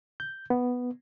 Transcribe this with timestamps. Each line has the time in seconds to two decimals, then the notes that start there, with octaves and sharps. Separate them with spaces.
0.20 G6
0.50 B3